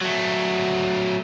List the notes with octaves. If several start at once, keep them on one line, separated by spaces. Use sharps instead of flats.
F#3 A3